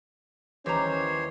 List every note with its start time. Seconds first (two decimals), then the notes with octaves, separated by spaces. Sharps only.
0.66 D#2 E3 C#4 D#4 G4 C5 C#5 A#5